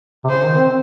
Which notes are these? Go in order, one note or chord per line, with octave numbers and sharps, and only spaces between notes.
C3
C#3 C5
D#3
C4